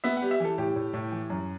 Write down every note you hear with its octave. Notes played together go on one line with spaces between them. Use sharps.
B3 E5
F#5
G3
E5
E3 A4
A2 G4
A2
A2
E3
F#2